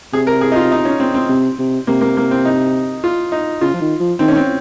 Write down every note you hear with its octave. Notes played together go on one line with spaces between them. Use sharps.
C3 G#4
A#4
G#4
D#4
F4
D#4
C#4
C4
C4
C3
C3
C3 A#3
A#3
A#3
C4
D#4
F4
D#4
C#3 F4
F3
D#3
F3
D#3 C4
C#4
C4